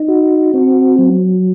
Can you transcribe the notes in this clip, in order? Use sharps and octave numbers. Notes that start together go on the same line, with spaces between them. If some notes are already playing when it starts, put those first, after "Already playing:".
Already playing: D#4
F#4
C4
F#3